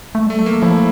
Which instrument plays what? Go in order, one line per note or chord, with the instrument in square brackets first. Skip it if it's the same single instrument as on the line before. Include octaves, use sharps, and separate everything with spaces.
[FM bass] A3
[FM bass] G3 [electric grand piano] A3
[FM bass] F#3 [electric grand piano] A3
[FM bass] F3 [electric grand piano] A#3
[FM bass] F3 [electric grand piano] E4